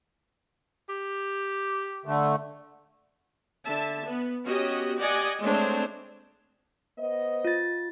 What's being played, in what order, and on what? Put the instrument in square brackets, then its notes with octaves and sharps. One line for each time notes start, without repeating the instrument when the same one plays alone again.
[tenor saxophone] G4
[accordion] D3 A3
[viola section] D3 E5 A5
B3
B3 C#4 F#4 G4 D#5
G4 D5 D#5 F#5 G#5
G#3 A3 C4 D4 C5 C#5
[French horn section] B3 C5 D#5
[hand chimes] F4 A6